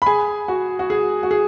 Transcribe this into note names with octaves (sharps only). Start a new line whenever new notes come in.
B5
G#4 G#5
F#4
F#4
G#4
F#4
G#4